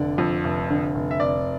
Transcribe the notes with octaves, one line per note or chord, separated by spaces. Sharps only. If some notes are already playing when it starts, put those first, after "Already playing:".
Already playing: F1 D3 D5
F2
F1
D3
F1
E5
F1 D5